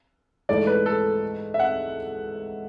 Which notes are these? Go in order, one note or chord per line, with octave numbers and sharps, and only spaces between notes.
G#2 E3 A3 D5
B4
A4
E5
F#5